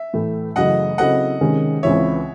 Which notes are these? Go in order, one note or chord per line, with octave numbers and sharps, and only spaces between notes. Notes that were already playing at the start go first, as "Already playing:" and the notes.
Already playing: E5
A2 E3 A3
F#2 C#3 E3 A3 D#5 F#5
C#3 F#3 C4 E4 A4 D#5 F#5
C3 D#3 G#3 C#4 G#4
C#2 C#3 E3 C4 C#5 E5